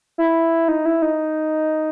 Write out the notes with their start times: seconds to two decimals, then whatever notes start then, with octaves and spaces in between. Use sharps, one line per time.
0.18 E4
0.68 D#4
0.86 E4
1.02 D#4